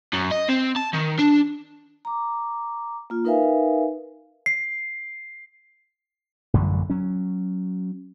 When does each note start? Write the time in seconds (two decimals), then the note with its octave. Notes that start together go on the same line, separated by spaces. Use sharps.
0.13 F#2
0.32 D#5
0.49 C4
0.76 A5
0.93 D#3
1.18 D4
2.05 A#5 D6
3.10 A#3 F4
3.25 D#4 A#4 B4 E5 F5 G#5
4.46 C7
6.54 A1 F#2 D3 G3
6.90 F#3 C#4